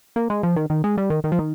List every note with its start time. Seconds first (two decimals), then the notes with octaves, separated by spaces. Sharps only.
0.16 A#3
0.30 G#3
0.43 F3
0.56 D#3
0.70 D#3
0.84 G#3
0.98 G3
1.10 D#3
1.24 D#3
1.32 F3
1.39 D#3